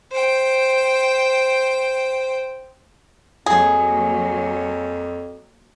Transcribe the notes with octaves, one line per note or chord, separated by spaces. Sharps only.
C5 G5
F2 F#3 A#3 G#4